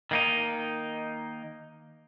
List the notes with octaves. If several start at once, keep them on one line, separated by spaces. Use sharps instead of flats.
D#3 A#3 D#4